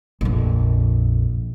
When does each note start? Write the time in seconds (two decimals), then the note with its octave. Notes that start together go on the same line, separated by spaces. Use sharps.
0.21 A#1 F2